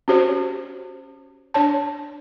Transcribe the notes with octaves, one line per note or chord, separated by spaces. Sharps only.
C#4 F#4 G4 C5 C#5
D4 C#5 A5